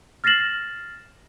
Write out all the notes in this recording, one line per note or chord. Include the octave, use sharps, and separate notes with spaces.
F6 A6 A#6 C7 E7 F#7